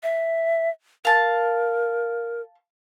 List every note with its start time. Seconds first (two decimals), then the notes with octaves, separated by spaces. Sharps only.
0.03 E5
1.05 A#4 F5 A5